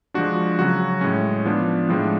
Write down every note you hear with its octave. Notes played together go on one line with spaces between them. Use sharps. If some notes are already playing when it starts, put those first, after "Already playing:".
F3 G#3 D4 F#4
C#3 F#3 C#4 F#4
A2 G#3 C#4
F3 B3 D4
A2 F3 G#3 D4